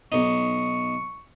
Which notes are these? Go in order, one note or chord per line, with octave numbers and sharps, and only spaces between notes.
B1 D#4 C#6